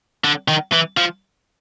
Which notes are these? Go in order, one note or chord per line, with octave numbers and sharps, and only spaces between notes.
D3
D#3
E3
F3